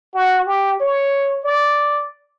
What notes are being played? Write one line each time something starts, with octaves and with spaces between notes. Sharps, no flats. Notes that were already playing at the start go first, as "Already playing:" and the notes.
F#4
G4
C#5
D5